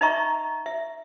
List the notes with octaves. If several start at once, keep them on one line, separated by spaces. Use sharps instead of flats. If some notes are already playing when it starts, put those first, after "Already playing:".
D#4 D#5 E5 A#5 C#6
E5